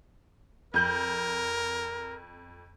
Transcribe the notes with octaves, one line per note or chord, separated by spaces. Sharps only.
F2 A#4 G6 F#7